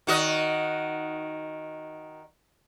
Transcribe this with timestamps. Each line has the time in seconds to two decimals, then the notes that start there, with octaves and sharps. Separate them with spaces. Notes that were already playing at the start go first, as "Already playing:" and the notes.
0.07 D#3 F#4 D#5